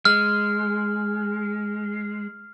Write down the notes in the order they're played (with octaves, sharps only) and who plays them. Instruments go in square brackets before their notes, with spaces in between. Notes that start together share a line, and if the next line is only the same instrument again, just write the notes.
[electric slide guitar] G#3 [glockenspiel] F6